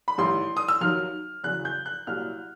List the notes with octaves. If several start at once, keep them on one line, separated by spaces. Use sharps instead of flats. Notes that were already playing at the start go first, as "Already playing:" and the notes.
B5
A1 G#2 D#3 G3 C6
D#6
E6
D#2 D#3 F#3 F6
E2 C#3 F#3 F#6
G6
F#6
C2 A#2 F#3 F6